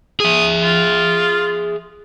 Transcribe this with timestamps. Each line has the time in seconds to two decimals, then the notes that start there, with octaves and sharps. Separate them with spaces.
0.20 G#4 E5 D#6
0.63 F4